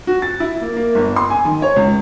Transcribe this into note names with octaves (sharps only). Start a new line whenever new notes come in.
F#4
A6
E4
A#3
A#3
G1
C6
G#5
D#3
C#5
C#2